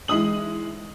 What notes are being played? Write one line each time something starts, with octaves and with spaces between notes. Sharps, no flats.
E3 G#3 D#4 D#6 F#7